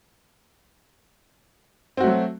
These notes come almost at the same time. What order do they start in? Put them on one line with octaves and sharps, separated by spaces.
C4 F#4 A3 F#3